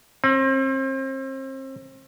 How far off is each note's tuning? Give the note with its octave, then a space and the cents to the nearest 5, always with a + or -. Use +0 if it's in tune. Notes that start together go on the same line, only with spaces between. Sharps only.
C4 +35